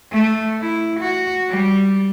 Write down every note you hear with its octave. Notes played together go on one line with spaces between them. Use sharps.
A3
E4
F#4
G3